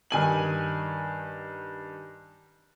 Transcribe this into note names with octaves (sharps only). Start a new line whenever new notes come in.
G2 D#3 G#5 F#7